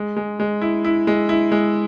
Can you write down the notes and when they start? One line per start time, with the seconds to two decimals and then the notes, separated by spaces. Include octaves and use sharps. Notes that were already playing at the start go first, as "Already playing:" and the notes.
Already playing: G#3
0.16 G#3
0.40 G#3
0.62 E4
0.85 E4
1.07 G#3
1.29 E4
1.52 G#3